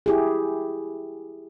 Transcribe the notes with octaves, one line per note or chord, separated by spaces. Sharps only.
E4 G4 G#4